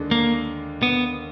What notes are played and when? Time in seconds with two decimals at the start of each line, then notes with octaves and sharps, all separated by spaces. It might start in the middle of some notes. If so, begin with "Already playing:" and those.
Already playing: D#2 D3 G#3 D4 G#4
0.11 A#3
0.83 B3